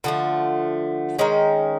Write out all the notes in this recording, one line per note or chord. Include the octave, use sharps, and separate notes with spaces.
D3 F3 A3
D#3 G#3 C#4